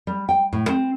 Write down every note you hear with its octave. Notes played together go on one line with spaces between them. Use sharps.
G3
G5
A2
C4